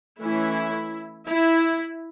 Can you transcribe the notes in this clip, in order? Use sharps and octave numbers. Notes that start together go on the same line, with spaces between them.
E3 A3 C#4 E4
E4